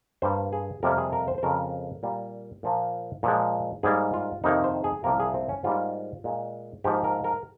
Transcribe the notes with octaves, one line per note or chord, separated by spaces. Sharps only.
G2 G3 A#3 C5
G#4
F2 C3 G3 A#3 A#4
G#4
A#4
C5
C5
F2 C#3 F3 A#4
A#2 G3 A#3
A#2 F3 A#3
A#2 F3 G#3
G#2 G3 A#3 G#4
F4
F2 C3 D#3 A#3 D#4
C5
G#4
C2 C3 F3 A#3 A#4
G#4
C4
C#4
G#2 G3 A#3 F4
A#2 G#3
G#2 F3 A#3 G4
A#4
A#4